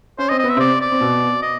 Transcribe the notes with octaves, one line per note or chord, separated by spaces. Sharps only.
C#4 C5
C4 D#5
B3 D#5
E5
C3 C4 D5
D5
C4
B2 B3
D#5